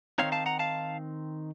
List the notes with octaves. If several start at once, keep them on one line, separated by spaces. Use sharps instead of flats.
D#3 A3 C4 D#4 C#5 F5
F5 A5
F#5 A#5
F5 A5